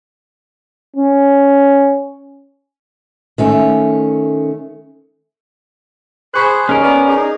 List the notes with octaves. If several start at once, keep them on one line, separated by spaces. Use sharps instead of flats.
C#4
D#3 A3 C#4
G#4 C5 B5 C#6 F#6
D#2 C#4 G#4 A#4 D#5 F6
B3 D5
D#4 G#4